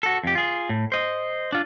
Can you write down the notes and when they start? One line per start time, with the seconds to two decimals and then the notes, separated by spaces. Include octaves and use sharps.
0.03 F#4 A4
0.24 F2 G4
0.35 F4 G#4
0.69 A2
0.92 C5 D#5
1.52 D4 F4